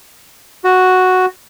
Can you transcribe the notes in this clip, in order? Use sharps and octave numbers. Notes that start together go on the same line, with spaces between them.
F#4